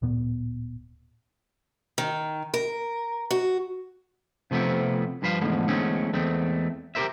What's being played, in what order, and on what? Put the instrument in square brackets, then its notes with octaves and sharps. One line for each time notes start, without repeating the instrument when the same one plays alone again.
[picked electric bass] D1 A#2 B3
[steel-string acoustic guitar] D#3
A#4
F#4
[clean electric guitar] C3 F3 A3 B3 C4
G2 F3 B4 C5 F5
E2 G#2 D3 F3 G#3 A3
E2 D3 G#3 A3 C4 C#4
E2 G#3 A3 C4
G4 A4 A#4 C5 E5